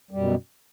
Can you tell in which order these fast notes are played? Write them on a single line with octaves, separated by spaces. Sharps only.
G3 F#2 B2